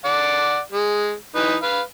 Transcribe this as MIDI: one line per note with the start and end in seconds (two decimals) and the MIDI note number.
0.05 0.59 74
0.05 0.59 78
0.71 1.13 56
1.36 1.55 52
1.36 1.55 63
1.36 1.55 71
1.63 1.80 71
1.63 1.80 77